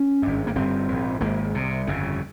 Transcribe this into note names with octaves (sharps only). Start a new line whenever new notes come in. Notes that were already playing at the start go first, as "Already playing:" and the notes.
Already playing: C#4
G#1 G2
A#3
G1 G2 C4
A#1 G#2
G#1 G#2 A#3
C2 C3
G1 F2 C#3